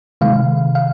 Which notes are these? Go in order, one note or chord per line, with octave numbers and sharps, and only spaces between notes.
C3 D#3 G#3 F5
F5